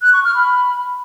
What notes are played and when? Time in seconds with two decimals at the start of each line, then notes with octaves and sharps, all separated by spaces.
0.02 F#6
0.13 C#6
0.24 F6
0.35 B5